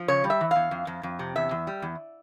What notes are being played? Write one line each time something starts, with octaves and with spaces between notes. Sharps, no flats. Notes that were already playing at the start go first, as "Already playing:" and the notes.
Already playing: F3
C#3 C#5
G3
E5
E3
E2 F5
F2
F2
F2
C3
E2 E5
E2
G3
E2